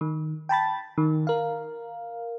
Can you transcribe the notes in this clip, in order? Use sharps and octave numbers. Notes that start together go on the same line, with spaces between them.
D#3
G5 A5 B5 A6
D#3
A#4 F5